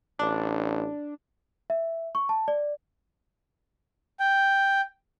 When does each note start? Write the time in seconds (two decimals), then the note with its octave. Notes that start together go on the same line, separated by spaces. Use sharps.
0.19 A1 D4
1.70 E5
2.15 C#6
2.29 A5
2.48 D5
4.20 G5